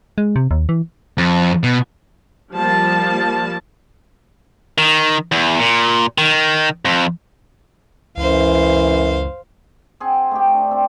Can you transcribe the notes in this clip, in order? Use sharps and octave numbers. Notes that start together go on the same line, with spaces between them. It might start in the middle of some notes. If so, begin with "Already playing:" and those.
G#3
C3
D#2
E3
F2
B2
F3 G3 A#3 A5
D#3
E2
A#2
D#3
F2
C#2 F#2 E3 C5 F5
C4 G#4 C5 F#5
A3 D#4 G4
D4
C4 A5